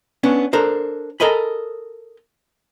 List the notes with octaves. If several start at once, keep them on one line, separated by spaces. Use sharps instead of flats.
B3 C#4 D4
D4 A4 A#4 C5
A4 A#4 D#5 G#5 B5